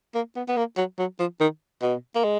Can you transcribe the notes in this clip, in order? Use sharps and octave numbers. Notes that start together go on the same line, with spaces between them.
A#3
B3
B3
A#3
F#3
F#3
F3
D#3
B2
A#3
G#3